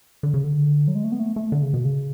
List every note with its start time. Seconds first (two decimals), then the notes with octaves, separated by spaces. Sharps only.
0.23 D3
0.34 C#3
0.44 D3
0.88 F#3
0.95 G#3
1.04 A3
1.12 B3
1.20 A3
1.36 A3
1.52 D3
1.63 C#3
1.74 B2
1.85 C#3